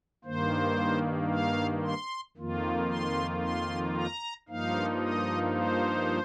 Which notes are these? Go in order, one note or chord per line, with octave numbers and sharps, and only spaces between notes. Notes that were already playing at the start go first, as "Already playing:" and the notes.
G2 D#3 A#3 C5
F5
C6
F2 D#3 A#3 F4
C6
C6
A#5
G2 F3 A#3 D#4 F5
D#5
C5